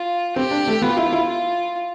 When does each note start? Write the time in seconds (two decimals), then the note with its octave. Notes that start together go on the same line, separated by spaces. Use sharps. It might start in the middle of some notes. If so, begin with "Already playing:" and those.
Already playing: F4
0.36 C4 G4
0.51 D4
0.67 A3
0.82 B3 F4
0.97 E4
1.13 E4
1.28 F4